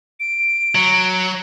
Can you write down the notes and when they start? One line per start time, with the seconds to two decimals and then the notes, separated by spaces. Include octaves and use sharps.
0.20 D7
0.75 F#3